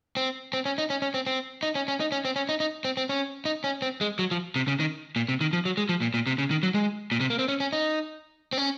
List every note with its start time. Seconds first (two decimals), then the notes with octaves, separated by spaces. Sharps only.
0.17 C4
0.53 C4
0.65 C#4
0.78 D#4
0.90 C#4
1.02 C#4
1.14 C4
1.27 C4
1.63 D#4
1.75 C#4
1.88 C#4
2.00 D#4
2.12 C#4
2.25 C4
2.36 C#4
2.49 D#4
2.60 D#4
2.85 C4
2.97 C4
3.09 C#4
3.45 D#4
3.64 C#4
3.82 C4
4.01 G#3
4.19 F#3
4.31 F3
4.56 C3
4.68 C#3
4.80 D#3
5.16 A#2
5.29 C3
5.41 D#3
5.53 F3
5.65 F#3
5.77 G#3
5.89 F3
6.01 A#2
6.14 A#2
6.27 C3
6.38 C#3
6.51 D#3
6.63 F#3
6.75 G#3
7.12 A#2
7.20 C3
7.30 A#3
7.39 C4
7.48 C#4
7.60 C#4
7.73 D#4
8.53 C4
8.58 C#4